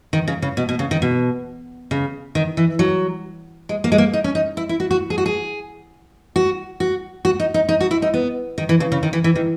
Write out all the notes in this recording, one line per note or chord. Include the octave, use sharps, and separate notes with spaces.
D#3
C#3
C#3
B2
B2
C#3
D#3
B2
C#3
D#3
E3
F#3
G#3
A#3
G#3
A#3
D#4
C#4
D#4
E4
E4
F#4
F#4
G#4
F#4
G#4
F#4
F#4
F#4
D#4
D#4
D#4
F#4
E4
D#4
B3
D#3
E3
C#3
C#3
D#3
E3
E3
D#3